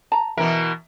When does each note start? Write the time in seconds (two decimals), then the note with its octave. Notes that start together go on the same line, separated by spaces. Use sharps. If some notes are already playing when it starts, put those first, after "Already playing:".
0.12 A5 A#5
0.37 B2 E3 A#4 E5